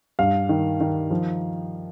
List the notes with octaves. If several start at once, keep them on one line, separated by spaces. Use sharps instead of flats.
G2 F5
D#3
D#3
F3